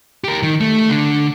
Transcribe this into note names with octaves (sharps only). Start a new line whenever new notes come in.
G4 A#4
D#3
A3
D3